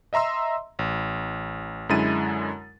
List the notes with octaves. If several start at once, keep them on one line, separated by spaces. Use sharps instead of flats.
D#5 E5 A#5 C6 E6
A1
F#2 D3 G#3 E4 A6 D#7